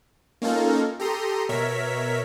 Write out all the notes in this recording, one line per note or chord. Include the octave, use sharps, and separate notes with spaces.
A#3 C#4 D#4 F4 A4 A#4
G4 A4 A#5 C6 D#6
B2 A#4 C#5 E5 B6